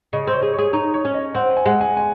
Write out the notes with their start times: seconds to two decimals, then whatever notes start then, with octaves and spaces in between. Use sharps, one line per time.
0.13 C#3 D#5
0.27 C4
0.33 C#5
0.42 G#4
0.53 C#5
0.59 G#4
0.73 D#4 C#5
0.94 C#5
1.05 C#4
1.14 D#5
1.34 C4 F#5
1.57 G#5
1.66 G#3 F#5
1.81 G#5
1.97 G#5